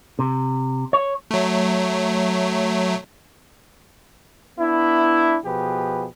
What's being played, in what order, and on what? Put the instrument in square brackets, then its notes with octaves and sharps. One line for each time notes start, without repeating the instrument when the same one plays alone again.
[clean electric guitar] C3
C#5
[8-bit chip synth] F#3 A3
[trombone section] B3 D4 E4
B2 F3 G4 G#4 B4